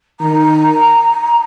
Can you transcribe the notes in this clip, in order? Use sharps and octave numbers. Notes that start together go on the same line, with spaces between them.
D#3 A#5